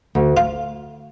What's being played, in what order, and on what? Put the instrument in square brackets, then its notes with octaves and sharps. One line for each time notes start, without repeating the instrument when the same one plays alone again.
[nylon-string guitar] D2
[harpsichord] F4